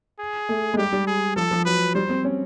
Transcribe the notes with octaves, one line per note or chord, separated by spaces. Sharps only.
G#4
A3
G#3
G3 G4
G3
G#4
F3 A4
F3
F#3 B4
G3 C5
C4
C#4